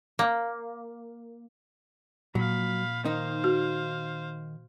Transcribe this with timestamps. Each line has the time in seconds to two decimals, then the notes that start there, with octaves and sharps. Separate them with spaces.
0.19 A#3
2.35 A#2 F#3 F5 B5
3.05 D#3 D#4 C5 F5
3.44 F#4